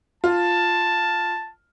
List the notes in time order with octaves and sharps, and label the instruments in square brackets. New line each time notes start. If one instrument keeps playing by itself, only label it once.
[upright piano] F4 [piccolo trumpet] A5